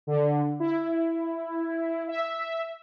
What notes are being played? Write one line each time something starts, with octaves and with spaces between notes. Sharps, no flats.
D3
E4
E5